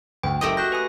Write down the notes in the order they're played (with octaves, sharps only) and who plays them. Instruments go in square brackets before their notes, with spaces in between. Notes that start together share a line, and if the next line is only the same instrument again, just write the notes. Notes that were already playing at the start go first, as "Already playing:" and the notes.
[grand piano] D2 [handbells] G5
[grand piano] F#1 [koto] A3 G4 D#5 [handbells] D#6
[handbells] F#4 F#6 A#6 [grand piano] G6
[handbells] B4 G#5 D#6